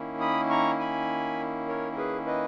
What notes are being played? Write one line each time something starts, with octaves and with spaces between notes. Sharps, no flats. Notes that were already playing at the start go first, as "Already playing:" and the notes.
Already playing: D#3 A#3 C#4 E4
B5 D#6
A#5 C#6
G#5 B5
A#4 C#5
A#4
G#4 B4
B4 D#5